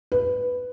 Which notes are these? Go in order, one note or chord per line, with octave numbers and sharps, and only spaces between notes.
B4